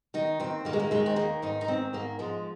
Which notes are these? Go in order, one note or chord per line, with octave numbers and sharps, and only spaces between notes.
D#3 D#4
D#2 C4
D#3 A#3
G#3
A#3
D#2 G#3
C4
D#3 A#3
G#2 D#4
D#4
D#3 C4
G#2 A#3
F3 G#3